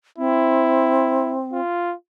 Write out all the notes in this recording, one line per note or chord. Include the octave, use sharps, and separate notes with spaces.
C4 E4
F4